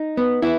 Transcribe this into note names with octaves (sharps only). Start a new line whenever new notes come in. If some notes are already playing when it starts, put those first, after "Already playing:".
Already playing: D#4
B3
B3 E4